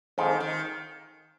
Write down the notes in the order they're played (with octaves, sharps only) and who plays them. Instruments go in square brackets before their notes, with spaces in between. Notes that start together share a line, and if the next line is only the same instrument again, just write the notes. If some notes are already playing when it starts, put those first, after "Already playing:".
[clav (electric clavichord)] F2 G#2 [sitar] D#3
[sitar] D#3